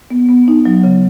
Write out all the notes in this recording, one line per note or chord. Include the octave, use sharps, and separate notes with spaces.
B3
B3
D#4
F#3
C#3